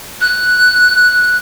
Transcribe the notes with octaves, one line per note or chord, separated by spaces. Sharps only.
F#6